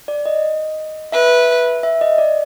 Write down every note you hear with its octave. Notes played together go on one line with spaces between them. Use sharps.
D5
D#5
B4 E5
E5
D#5
D5